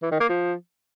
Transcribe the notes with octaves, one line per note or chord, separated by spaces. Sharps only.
E3
D#3
A#3
F3